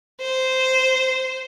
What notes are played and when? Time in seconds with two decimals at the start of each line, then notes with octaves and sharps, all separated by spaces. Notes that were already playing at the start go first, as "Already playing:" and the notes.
0.20 C5